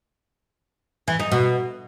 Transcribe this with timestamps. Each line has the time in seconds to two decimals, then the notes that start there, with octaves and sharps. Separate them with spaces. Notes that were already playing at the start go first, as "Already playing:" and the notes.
1.08 E3
1.20 D#4
1.32 B2